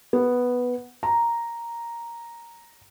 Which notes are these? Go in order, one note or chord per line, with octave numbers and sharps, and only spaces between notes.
B3
A#5